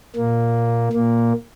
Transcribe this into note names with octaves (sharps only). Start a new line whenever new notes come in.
A#2 A#3
A#2 A#3